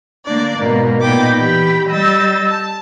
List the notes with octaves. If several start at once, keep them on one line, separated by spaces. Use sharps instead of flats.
D3 A#3 D4 D5
G#2 B2 A#3
A#2 B3 D#4 G5 B5 D6
E3 G4 G5 B5
G3 D#5 E6 G6 A6
A5